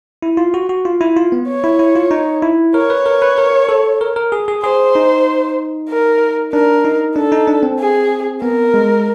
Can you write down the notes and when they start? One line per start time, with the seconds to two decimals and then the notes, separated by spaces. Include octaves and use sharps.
0.22 E4
0.37 F4
0.54 F#4
0.69 F#4
0.85 F4
1.01 E4
1.16 F4
1.32 B3
1.48 C#5
1.64 E4
1.79 E4
1.96 F4
2.11 D#4
2.42 E4
2.74 A#4 C#5
2.90 B4
3.06 A#4
3.22 B4
3.38 A#4
3.69 A4
4.01 A#4
4.16 A#4
4.32 G#4
4.48 G#4
4.63 G#4 C5
4.95 D#4
5.90 A#4
6.53 D4 A#4
6.85 D#4
7.16 D4 A4
7.32 D#4
7.47 D4
7.63 C4
7.79 G#4
8.42 B3 A#4
8.74 G#3